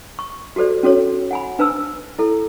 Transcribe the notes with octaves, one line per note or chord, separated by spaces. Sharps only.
C#6
F#4 G4 A4 C5 D5
C#4 F#4 A4 C#5
F#5 G#5 B5
D4 B4 C5 A5 E6
E4 A4